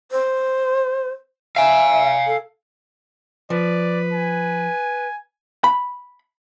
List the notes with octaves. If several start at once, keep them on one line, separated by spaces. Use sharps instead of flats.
C5
E5 F5 G#5
A4
F3 B4 D5
G#5
B5